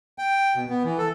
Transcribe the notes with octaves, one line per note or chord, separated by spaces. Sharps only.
G5
B2
B3
E3
A4